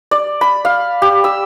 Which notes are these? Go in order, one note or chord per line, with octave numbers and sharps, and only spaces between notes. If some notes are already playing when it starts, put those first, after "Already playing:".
D5
B5
F5
G4
E6